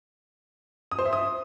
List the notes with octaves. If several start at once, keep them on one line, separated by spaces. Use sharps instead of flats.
D#6
C5
E5
D#6